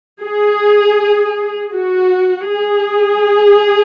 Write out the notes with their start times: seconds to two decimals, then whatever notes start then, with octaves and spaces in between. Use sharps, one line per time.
0.22 G#4
1.74 F#4
2.50 G#4